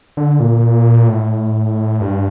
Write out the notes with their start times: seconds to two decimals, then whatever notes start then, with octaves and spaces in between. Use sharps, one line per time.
0.17 D3
0.40 A#2
1.08 A2
2.01 G2